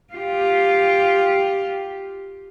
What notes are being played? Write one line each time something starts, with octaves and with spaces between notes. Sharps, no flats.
F4 G4